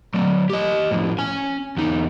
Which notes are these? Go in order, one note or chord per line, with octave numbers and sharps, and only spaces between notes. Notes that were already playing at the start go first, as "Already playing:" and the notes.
F#3 A3
G4 D#5
A2 F3
C#4 G#5
E2 D#4